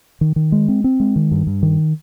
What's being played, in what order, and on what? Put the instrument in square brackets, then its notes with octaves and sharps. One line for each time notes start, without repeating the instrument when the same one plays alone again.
[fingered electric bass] D#3
D#3
G#3
C4
C4
G#3
D#3
G2
G2
D#3